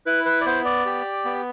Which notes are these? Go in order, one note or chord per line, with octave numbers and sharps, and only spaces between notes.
E4 B4
B4
D5
B3 C5
D5
G4
B3